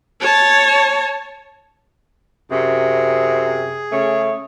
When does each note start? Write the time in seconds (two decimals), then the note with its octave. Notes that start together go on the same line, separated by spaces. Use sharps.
0.21 C#5 A5
2.50 F#2 C3 G#4
3.92 C#3 A3 C#5